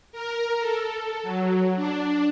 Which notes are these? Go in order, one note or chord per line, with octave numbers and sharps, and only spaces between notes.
A#4
A4
F#3
D4